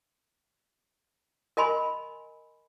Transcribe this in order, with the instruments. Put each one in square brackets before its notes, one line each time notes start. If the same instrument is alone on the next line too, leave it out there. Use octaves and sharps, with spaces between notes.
[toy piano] A#4 D#5 G#5 B5 C6